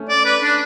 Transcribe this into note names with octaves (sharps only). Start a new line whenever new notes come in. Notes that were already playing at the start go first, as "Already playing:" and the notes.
Already playing: A3 C#4
D5
B4
D4